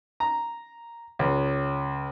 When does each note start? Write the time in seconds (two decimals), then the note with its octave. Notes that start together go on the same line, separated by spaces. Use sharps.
0.20 A#5
1.19 C#2